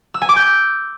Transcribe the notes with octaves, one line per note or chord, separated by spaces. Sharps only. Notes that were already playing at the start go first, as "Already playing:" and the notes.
E6
G#5
D6
G6